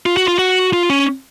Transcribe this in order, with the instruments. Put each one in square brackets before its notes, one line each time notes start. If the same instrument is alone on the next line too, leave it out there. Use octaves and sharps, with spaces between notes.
[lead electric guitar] F4
F#4
F4
F#4
F4
C#4